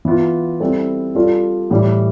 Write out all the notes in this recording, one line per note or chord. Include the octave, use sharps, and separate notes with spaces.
E3 B3 F4
G3 C4 E4 A4
G3 D4 F4 A4
A2 E3 G3